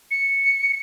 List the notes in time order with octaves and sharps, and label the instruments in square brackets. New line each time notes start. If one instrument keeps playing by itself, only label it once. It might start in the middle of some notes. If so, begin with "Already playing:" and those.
[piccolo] C#7